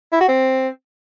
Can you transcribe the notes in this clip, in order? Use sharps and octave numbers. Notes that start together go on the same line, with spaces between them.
E4
F#4
C4